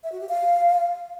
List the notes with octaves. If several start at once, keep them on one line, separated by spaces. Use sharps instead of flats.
E5
F#4
G4
F5